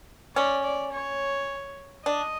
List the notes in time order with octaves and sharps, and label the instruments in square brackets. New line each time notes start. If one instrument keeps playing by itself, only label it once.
[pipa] C#4 [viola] D5
[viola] D5
C#5
[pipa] D4 [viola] D#5